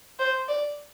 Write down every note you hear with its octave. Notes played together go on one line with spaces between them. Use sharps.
C5
D5